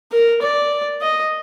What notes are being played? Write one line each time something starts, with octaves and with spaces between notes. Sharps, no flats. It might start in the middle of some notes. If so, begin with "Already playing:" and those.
A#4
D5
D#5